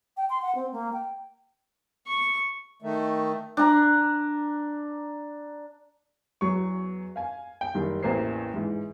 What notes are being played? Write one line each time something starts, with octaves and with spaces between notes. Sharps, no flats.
G5
C6
F#5
C4
A#3
G5
C#6
D#3 A3
D4 A#5
E2 F#3 C#6
F5 G#5
G5
F#1 D#3 G3
A1 E2 E3 A#3 C5 C7
G#2 E3